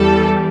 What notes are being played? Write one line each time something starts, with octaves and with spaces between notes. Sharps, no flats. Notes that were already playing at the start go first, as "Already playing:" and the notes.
Already playing: E2 E3 G3 A4